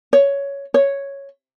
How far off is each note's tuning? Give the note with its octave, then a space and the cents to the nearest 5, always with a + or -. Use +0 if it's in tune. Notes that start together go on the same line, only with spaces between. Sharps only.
C#5 +10
C#5 +0